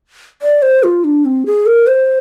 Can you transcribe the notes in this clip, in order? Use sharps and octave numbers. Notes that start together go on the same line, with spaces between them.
D5
C5
F4
D4
C4
G#4
A#4
C5